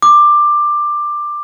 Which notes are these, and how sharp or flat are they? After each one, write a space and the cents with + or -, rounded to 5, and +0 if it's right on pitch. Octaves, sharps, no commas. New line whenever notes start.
D6 +15